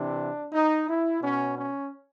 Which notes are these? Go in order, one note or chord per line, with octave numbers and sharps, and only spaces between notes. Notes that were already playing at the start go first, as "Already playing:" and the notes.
Already playing: C3 E3 D4
D#4
E4
B2 C#4
C#4